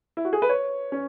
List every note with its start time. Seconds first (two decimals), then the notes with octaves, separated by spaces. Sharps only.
0.17 E4
0.25 F#4
0.33 G#4
0.42 B4
0.49 C#5
0.92 C#4